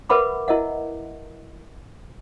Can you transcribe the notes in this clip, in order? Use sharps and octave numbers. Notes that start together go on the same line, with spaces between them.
A#4 B4 E5 F#5 B5 D6
E4 A#4 D#5 E5 F#5